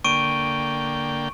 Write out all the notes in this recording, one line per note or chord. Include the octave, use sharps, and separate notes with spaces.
D3 A#3 G5 C#6 D7 D#7